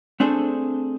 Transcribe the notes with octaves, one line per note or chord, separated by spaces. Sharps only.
A3 C4 D4 G#4 A4 C5